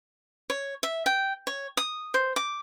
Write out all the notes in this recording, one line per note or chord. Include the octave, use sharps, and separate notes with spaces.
C#5
E5
G5
C#5
D#6
C5
D6